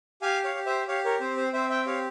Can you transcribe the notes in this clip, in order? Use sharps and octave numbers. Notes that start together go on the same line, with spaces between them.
G4 F5 G#5
C#5 F5
G4
C5 E5
G4 C#5 F5
A#4 C#5
C4 C5
C5
C4 C5 E5
E5 G5
G4 C#5 F5